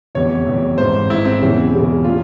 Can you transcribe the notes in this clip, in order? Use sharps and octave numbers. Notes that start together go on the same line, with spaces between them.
F1 E2 E3 C#5
F1 E2 E3
G#1 G#2 E3 C5
G#1 G#2 E3 E4
C4
E1 E2 C#3 E3 C#4
E1 E2 C#3 E3
A#2 F4